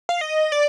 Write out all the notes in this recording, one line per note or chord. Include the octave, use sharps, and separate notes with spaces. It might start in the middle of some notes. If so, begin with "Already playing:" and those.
F5
D#5
D5